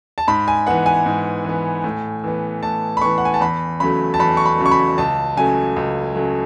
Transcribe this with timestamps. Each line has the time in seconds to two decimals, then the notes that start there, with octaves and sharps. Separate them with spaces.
0.18 A5
0.28 G#2 B5
0.48 G#5
0.67 E3 B3 F#5
0.86 G#5
1.06 G#2
1.45 E3 B3
1.84 A2
2.24 E3 B3
2.63 A2 A5
2.97 B5
3.02 E3 B3 C#6
3.18 F#5
3.25 G#5
3.34 A5
3.41 E2 B5
3.80 C#3 F#3 A3 B5
4.14 A5
4.20 E2 B5
4.37 C#6
4.46 B5
4.58 C#3 F#3 A3
4.66 C#6
4.71 B5
4.98 C#2 A5
5.37 C#3 F#3 A3 G#5
5.76 C#2
6.15 C#3 F#3 A3